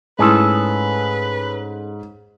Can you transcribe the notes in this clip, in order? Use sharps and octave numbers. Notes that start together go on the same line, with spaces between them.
G#2 A3 C#4 E4 G#4 A4 B4 C6